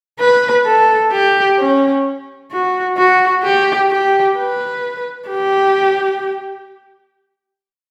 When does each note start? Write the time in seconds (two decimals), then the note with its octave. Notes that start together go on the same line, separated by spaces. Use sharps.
0.20 B4
0.65 A4
1.12 G4
1.59 C#4
2.52 F#4
2.97 F#4
3.43 G4
3.91 G4
4.36 B4
5.29 G4